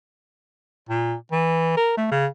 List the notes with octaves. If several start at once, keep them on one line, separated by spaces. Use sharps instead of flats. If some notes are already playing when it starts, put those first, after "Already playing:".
A#2
E3
A#4
A3
C#3